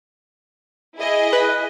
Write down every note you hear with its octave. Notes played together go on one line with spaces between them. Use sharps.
E4 G#4 D#5
B4